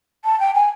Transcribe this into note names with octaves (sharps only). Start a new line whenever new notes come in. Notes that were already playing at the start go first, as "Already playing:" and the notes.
A5
G5
G#5